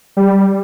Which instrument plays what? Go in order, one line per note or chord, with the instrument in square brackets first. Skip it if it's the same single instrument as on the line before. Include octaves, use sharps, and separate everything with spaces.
[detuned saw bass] G3